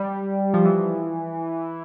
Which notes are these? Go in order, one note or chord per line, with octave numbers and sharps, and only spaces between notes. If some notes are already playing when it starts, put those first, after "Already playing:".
Already playing: G3
F3
E3